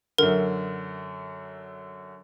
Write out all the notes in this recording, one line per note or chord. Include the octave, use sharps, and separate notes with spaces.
F#2 D3 A#4